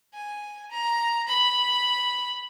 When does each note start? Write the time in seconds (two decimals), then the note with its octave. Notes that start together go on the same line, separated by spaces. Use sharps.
0.14 G#5
0.71 A#5
1.28 B5